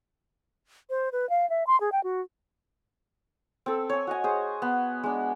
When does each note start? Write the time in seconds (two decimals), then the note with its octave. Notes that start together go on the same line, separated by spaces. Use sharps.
0.90 C5
1.12 B4
1.30 F5
1.50 E5
1.67 C6
1.80 G#4
1.92 G5
2.04 F#4
3.66 C4 A4
3.89 C#5 G#5
4.07 F#4 D#5 G#5
4.24 G#4 C5
4.62 B3
5.03 G#3 D4